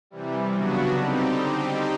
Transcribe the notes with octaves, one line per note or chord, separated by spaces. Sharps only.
C3 E3 G3
C#3 F#3 B3 D4 F#4
D3 G3 C4 D#4 G4